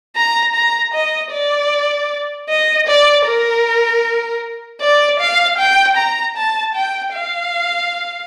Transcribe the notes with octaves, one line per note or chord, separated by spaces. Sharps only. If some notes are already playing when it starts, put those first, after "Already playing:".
A#5
A#5
D#5
D5
D#5
D5
A#4
D5
F5
G5
A#5
A5
G5
F5